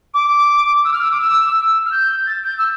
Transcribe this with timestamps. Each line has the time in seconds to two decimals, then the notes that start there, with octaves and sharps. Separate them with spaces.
0.14 D6
0.85 E6
0.93 F6
1.02 E6
1.11 D6
1.20 E6
1.86 F6
1.91 G6
2.26 A6
2.44 G6
2.58 E6